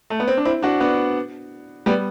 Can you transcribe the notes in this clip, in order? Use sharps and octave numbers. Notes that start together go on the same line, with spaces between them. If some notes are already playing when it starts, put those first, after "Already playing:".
A3
B3
C4
D4
C4 E4
D4 F#4
B3 D4
G3 B3